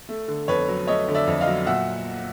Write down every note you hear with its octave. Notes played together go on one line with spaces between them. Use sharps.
A3
D3
F2 B4 C#5
F#3
A3 C#5 D#5
D3
D5 E5
F2
D#5 F5
F#3
A#2 E5 F#5